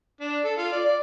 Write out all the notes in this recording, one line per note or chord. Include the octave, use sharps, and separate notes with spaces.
D4
A4
F4
D5
D5